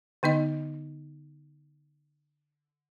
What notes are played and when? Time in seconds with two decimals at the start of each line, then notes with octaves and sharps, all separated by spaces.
0.23 D3 B3 D#4 D#5